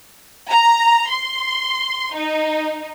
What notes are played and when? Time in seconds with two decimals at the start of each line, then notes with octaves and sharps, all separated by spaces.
0.50 A#5
1.09 C6
2.14 D#4